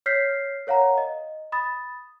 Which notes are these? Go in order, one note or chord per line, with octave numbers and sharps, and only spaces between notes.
C#5 F6 G6 B6 C7
A#4 C#5 F5 F#5 A#5
D#5
B5 D#6 A6